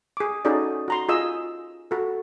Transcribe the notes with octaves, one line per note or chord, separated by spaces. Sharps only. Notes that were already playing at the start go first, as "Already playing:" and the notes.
G#4 D6
C#4 D#4 F#4 G#4 A4 D5
F#4 A#5 C6
F4 G#4 D#5 E6
F#4 A4